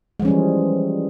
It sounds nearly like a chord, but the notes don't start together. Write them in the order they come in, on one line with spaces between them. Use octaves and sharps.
G#3 F3 C#4 G3 E3